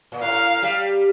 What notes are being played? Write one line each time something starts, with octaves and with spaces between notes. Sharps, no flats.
A#2
A2 F5
G3